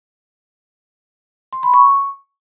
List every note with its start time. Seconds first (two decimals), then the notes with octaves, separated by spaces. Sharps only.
1.53 C6
1.63 B5
1.74 C#6